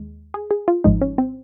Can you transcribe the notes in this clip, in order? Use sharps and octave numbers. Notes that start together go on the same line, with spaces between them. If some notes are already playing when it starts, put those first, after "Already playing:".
Already playing: D#2 G#3
G#4
G#4
F4
G#1 G#2 F3 G#3 D#4
C#4
C4